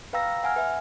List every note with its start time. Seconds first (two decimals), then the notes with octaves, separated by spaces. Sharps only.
0.13 B4 F5 G5 A#5 E6 A#6
0.43 F#5 G#5 F6
0.56 B4 E5